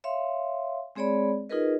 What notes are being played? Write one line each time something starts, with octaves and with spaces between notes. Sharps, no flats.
C#5 E5 F5 C6
G#3 C4 G#4 C#5 D5 B5
D#4 F4 G#4 A#4 B4 D#5